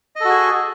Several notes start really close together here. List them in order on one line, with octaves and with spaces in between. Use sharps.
D#5 A4 F#4 G#4